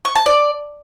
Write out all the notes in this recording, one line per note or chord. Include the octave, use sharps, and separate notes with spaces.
C#6
A5
D5